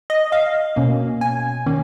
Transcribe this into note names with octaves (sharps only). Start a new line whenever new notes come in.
D#5
F5
B2 A#3 C#4
G#5
D#3 A#3 C#4